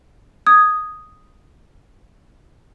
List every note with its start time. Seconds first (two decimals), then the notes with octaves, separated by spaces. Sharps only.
0.47 D#6 G#6